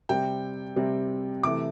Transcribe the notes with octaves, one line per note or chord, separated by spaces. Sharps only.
C3 G3 C4 G5
C3 G3 C4
C3 E3 A3 D6